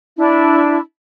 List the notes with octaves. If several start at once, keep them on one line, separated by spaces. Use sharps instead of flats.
D4 E4